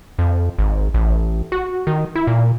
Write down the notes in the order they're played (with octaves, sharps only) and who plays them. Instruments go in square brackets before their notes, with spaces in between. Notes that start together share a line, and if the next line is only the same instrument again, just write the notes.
[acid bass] F2
G#1
A1
F#4
D#3
E4
A#2